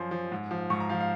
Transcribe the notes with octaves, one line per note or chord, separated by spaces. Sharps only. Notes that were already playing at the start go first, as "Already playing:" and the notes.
Already playing: F#2 F3 C6
F3
G#2
F3
G#2 C#6
A#5
F3 F5
F5